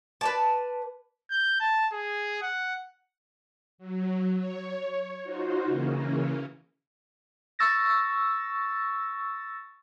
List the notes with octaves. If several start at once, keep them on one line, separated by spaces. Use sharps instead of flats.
B4 D5 A5
G6
A5
G#4
F#5
F#3
C#5
D#4 F4 F#4 C5
C#3 E3 A#3 C#4
C#6 E6 A6 A#6